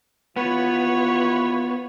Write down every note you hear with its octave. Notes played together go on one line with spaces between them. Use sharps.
D#2 E3 B3 F4 B4 C#5